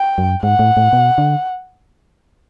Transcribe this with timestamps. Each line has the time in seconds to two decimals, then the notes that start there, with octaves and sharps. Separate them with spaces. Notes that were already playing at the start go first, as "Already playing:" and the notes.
Already playing: G5
0.18 F#2
0.43 G#2 F#5
0.59 A2
0.77 A2
0.93 B2
1.18 D3